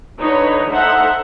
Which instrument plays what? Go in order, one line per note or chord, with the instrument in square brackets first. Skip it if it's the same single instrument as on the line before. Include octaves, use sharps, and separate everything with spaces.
[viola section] D3 D#4 B4 C#5
D#4 A4 C5 E5 F#5